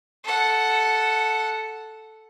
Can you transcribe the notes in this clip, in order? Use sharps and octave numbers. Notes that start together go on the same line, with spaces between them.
A4 F#5